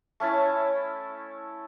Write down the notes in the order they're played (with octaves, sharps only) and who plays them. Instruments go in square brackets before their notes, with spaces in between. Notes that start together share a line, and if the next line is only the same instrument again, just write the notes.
[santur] A3 C#4 E4 A5